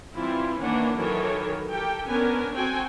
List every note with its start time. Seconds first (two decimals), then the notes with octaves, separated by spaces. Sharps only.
0.15 E3 G3 C4 E4 F4
0.61 D#3 E3 A#3 C#4 D4 F#5
0.98 D#3 E3 F#3 A4 A#4 C#5
1.68 G4 A4 A#4 G5
2.07 B3 C#4 D4 A#4 G#5
2.55 C4 F#4 A4 G5 G#5